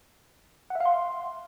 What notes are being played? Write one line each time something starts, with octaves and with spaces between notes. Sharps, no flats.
F#5
E5
F5
C6